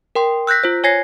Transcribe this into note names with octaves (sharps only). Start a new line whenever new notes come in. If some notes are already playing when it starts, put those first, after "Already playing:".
A#4 G5 C6
E6 F#6 G6 A#6 B6
F4 C5
C#5 G#5 G#6 A#6 C7